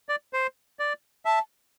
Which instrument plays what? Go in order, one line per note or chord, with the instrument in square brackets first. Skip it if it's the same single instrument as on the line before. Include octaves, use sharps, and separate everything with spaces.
[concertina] D5
C5
D5
[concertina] E5 [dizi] A5